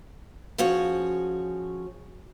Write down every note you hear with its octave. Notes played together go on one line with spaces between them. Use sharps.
F3 C#4 F#4 G#4 C#5